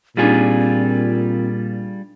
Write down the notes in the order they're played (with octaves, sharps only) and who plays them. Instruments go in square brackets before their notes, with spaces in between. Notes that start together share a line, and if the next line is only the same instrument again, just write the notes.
[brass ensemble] A#2 [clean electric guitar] G3 F4 G#4 [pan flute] C4 [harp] D4 D#4 D5